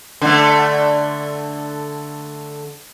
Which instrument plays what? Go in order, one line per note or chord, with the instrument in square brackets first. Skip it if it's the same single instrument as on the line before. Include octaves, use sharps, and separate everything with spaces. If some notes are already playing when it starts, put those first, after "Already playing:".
[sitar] D3 A3